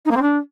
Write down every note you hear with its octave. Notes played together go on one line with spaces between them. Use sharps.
D#4
A#3
C4
D4